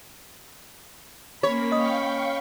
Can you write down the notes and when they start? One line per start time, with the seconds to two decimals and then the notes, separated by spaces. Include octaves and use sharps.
1.43 A#3 C#4 C#5 B5
1.72 D#5 F5 G5 C#6 D#6